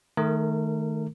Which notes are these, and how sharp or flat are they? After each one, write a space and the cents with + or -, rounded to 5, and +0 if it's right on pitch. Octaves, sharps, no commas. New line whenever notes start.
D#3 +0 A3 -5 A#4 -25